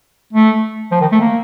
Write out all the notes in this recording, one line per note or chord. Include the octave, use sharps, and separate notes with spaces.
A3
F3
D#3
A3
A#3